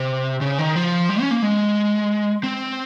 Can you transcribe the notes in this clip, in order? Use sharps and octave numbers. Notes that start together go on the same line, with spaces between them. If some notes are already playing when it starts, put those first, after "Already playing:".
Already playing: C3
C#3
D#3
F3
G3
C#4
A#3
G#3
C4